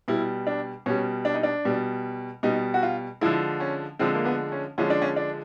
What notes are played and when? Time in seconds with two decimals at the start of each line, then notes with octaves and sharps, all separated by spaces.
0.08 B2 G3 E4
0.47 D4
0.86 B2 G3 C#4
1.25 D4
1.34 D#4
1.43 D4
1.65 B2 G3
2.43 B2 G3 D#4
2.74 F#4
2.83 F4
3.21 D3 F3 G#3 E4
3.60 C#4
3.99 D3 F3 G#3 C4
4.14 A#3
4.25 B3
4.52 C#4
4.78 D3 F3 G#3 C#4
4.90 D4
5.02 C#4
5.16 D4